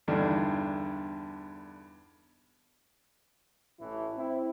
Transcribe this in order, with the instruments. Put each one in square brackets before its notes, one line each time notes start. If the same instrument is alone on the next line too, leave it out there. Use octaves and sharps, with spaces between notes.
[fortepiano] E2 G2 D3 D4 D#4
[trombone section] A1 A2 E3
C4 E4